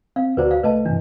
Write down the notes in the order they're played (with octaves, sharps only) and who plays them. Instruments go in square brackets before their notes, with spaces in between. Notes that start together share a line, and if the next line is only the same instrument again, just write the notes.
[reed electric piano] C4 [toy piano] F5
[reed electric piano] D2 F#4 D5 [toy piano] B4 C5 A#5
[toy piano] F5
[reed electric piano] C2 A3 [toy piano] B4 D#5 A5
[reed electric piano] G2 C3 E3 [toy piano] D4